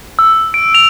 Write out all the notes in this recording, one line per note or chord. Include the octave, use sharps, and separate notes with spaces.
E6
D7
F7